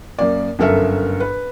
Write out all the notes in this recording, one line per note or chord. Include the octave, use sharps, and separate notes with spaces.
F#2 A#3 D5
G1 F#2 A4 A#4 E5
B4